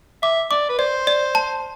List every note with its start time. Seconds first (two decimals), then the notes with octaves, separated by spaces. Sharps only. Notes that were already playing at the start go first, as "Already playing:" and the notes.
0.23 E5 D6
0.51 D5 D6
0.69 B4
0.79 C5 D5
1.07 D5
1.35 A5